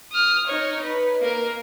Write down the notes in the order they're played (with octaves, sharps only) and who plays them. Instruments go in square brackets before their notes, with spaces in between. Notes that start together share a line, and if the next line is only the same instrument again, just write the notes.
[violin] D#6 F6
D#4 C#5
B4
A#3 A#4